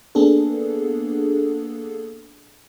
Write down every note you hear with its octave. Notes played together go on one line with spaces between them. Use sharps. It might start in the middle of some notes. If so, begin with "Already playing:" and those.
A#3 B3 D4 G#4 A4